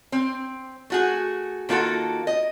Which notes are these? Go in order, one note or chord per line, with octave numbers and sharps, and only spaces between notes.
C4
A3 F#4 G#4
D#3 A#3 F4 F#4 A4
D#5